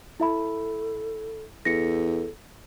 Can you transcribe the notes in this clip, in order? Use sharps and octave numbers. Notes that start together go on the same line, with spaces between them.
E4 A4 E5 B5
E2 A4 A#6 C#7